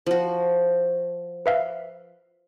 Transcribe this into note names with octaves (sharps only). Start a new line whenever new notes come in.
F3 F#4
B4 E5 F5